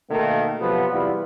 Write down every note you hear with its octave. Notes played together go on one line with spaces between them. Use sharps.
B2 D#3 A3 A#3
C3 F3 F#3 B3
E2 C3 G3 E4 F4 B4